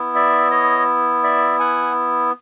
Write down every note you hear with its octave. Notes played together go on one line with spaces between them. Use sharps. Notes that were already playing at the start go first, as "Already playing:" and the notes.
Already playing: B3 E4
D5 E5
C#5 D#5
D5 E5
F#5 G#5